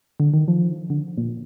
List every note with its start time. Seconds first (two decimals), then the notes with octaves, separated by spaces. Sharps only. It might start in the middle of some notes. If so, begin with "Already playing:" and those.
0.20 D3
0.34 D#3
0.48 F3
0.90 D3
1.18 A#2